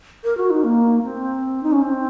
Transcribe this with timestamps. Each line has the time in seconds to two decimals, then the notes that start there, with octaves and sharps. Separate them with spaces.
0.24 A#4
0.37 F#4
0.50 D#4
0.64 A#3
1.03 C4
1.63 D#4
1.72 C#4
1.82 C4